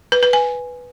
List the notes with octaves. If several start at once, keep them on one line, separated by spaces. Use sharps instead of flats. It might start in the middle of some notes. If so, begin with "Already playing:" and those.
B4
B4
G#5